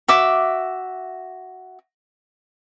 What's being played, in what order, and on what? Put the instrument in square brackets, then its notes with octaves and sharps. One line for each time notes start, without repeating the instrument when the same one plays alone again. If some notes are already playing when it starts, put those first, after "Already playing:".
[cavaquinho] F#4 E5 D6